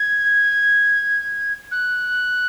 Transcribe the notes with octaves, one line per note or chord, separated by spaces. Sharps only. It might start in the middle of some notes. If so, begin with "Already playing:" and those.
Already playing: G#6
F#6